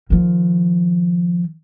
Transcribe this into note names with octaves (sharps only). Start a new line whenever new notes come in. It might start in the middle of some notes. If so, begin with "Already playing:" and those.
D#3 F3